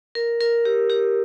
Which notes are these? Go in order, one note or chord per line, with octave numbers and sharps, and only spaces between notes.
A#4
A#4
G4
G4